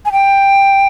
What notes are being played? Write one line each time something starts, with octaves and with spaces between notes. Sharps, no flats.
G#5
G5